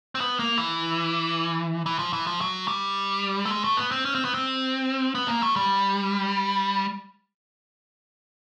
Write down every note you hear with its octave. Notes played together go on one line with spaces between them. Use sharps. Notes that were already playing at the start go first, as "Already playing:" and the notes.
C4
B3
A#3
E3
E3
F3
E3
F3
F#3
G3
A3
G#3
A3
B3
C4
C#4
C4
B3
C4
B3
A#3
A3
G3